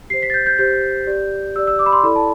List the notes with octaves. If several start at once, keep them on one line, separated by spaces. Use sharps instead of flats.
G4 C5 C7
B6
A6
G6
G6
G4 C5 G6
G4 D5
G4 D5 E6
E6
D6
B5
C6
E4 A4 D5 B5
A5